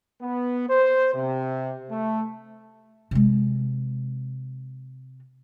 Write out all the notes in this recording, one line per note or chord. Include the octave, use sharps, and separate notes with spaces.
B3
C5
C3
A3
C3 G#3